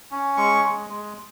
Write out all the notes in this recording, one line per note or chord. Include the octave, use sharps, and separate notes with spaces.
C#4
G#3 C#6
G#3
G#3